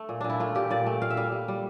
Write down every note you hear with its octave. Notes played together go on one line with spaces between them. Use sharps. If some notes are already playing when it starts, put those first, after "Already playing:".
Already playing: A3
A#2
A#2 D4
E4
A3 F4
A#2 G4
A#2 D5
A3
A#2 F5
E5
G3 F5
G3
G3